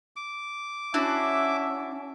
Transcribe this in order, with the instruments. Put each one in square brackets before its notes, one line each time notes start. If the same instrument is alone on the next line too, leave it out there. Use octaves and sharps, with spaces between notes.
[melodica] D6
[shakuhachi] C#4 [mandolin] D4 E4 F#4 [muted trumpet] E5